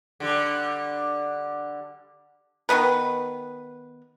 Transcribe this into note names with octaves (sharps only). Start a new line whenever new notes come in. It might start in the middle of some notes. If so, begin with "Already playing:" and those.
D3 G3
D#3 A3 B3 B4